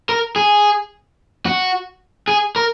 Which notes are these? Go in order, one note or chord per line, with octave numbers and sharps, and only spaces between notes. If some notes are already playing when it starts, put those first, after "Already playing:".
A#4
G#4
F#4
G#4
A#4